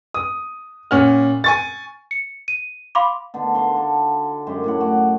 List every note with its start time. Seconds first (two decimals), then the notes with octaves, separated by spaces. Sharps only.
0.14 D#6
0.91 A#2 C#4 F#5 F6
1.44 G#5 C#6 A6
2.11 C#7
2.48 D#7
2.95 F5 B5 C6 D6
3.34 D3 B3 D#4
3.55 F#4 F5 C6
3.77 A4
4.47 F#2 G#3 G4 C6
4.64 A2 C#3 F#5
4.81 F#4 D6